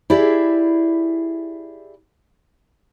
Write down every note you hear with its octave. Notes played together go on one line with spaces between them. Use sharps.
E4 G4 G#4 D5 E5